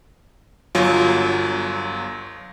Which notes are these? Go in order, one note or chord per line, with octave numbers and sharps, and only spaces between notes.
G1 F#3 F4